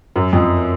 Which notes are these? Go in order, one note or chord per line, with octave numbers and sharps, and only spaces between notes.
F#2
F2